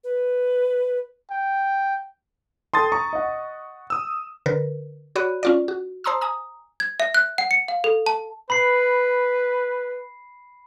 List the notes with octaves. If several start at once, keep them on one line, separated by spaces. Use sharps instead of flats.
B4
G5
A4 G5 A5 C6 D#6 A6
A#5 C#6
D#5 F#5
D#6 E6
D3 A#4 B4
F#4 C#5 D5 B5 F#6 D#7
C#4 F4 D5
F#4
C5 A5 A#5 C6 D#6 E6
G#5 A#5 D#6
G#6
E5
F#6
F#5
C#7
F5
A4
A5
B4 B5 C7